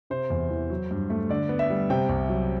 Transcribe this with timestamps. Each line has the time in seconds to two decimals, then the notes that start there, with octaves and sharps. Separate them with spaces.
0.10 C3 C5
0.30 E2
0.50 E3
0.70 F#3
0.91 G2
1.10 A3
1.29 D3 D5
1.49 B3
1.59 E5
1.70 G3
1.90 C3 G5
2.09 C2
2.29 F#3